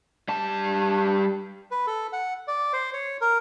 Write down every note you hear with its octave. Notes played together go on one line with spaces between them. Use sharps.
G3 A5
B4
A4
F#5
D5
C5
C#5
A#4